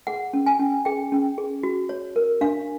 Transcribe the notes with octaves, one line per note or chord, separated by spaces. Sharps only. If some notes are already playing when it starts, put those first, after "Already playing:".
G#4 F#5
C#4
G#5
C#4
G#4 G5
C#4
G#4
F#4
C#5
A#4
D4 F5